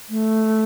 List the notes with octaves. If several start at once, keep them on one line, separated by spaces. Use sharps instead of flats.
A3